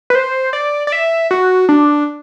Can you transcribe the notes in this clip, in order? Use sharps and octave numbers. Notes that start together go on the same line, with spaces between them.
B4
C5
D5
D5
E5
F#4
D4